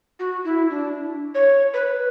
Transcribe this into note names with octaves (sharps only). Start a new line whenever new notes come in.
F#4
E4
D4
C#5
B4